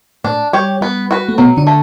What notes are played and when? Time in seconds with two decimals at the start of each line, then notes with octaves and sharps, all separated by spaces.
0.24 A2 A3 D4
0.53 G3 G4 C#5
0.81 G3 B3
1.11 F#4 B4
1.29 A3
1.38 B2 F#3 B3
1.57 D3 D4
1.67 A3